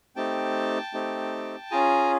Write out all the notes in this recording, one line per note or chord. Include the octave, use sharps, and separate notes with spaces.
A3 C4 D#4 G4 G5 A5
A3 C4 D#4 G4
C#4 F4 G#4 G#5 A#5